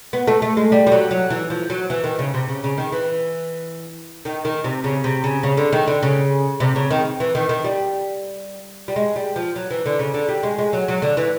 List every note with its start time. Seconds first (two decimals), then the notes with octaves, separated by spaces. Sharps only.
0.13 B3
0.27 A3
0.42 A3
0.57 G#3
0.72 G3
0.87 G3
0.92 F#3
1.11 F#3
1.30 E3
1.50 F3
1.70 F#3
1.90 E3
2.04 D#3
2.19 C#3
2.34 C3
2.48 C#3
2.64 C#3
2.78 D#3
2.92 E3
4.25 D#3
4.45 D#3
4.64 C3
4.84 C#3
5.04 C3
5.24 C#3
5.43 C#3
5.57 D3
5.73 D#3
5.87 D3
6.02 C#3
6.60 C3
6.76 C#3
6.91 D#3
7.20 E3
7.35 D#3
7.49 D#3
7.65 G3
8.88 G3
8.96 G#3
9.16 G3
9.36 F3
9.56 F#3
9.71 E3
9.86 D3
9.99 C#3
10.14 D3
10.29 G3
10.43 G#3
10.59 G#3
10.73 F#3
10.88 F#3
11.02 D3
11.17 E3